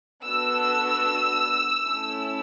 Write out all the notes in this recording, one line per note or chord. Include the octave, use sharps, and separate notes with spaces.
B3 D4 F#4 A4 E6
A3 C#4 E4 A4